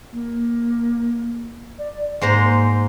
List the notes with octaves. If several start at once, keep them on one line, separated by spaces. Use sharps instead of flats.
A#3
D5
G#2 A#3 C5 A#5